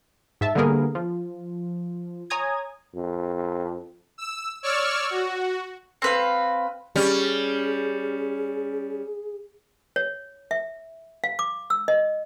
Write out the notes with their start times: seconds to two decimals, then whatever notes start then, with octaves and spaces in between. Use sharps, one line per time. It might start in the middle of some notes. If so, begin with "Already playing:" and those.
0.41 G#2 E5 A5
0.55 D3 G3 A#3 B3 G#4 A#4
0.95 F3
2.30 C#5 G#5 A#5 D#6 G#6
2.95 F2
4.18 E6
4.63 C#5 D5 C#6 E6 F6
5.10 F#4
6.02 C4 B4 F5
6.96 G3 C#4 G#4
9.96 C#5
10.51 E5
11.24 F5
11.39 D6
11.70 E6
11.88 D#5